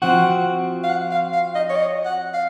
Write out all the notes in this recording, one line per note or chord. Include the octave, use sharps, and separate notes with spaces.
F3 C4 F#4 F#5
F5
F#5
F5
F5
D#5
C#5
D#5
F#5
F5